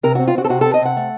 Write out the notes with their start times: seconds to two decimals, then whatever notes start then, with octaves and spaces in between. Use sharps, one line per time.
0.03 C3 A#4
0.15 C4 F#4
0.27 F4
0.35 C4 F#4
0.44 A4
0.49 C3 F#4
0.61 C4 A4
0.74 D#5
0.81 C3 F#5
0.97 A3